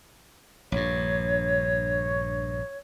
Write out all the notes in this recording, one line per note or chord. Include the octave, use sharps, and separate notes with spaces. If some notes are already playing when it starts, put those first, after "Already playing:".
A#1 G2 C#5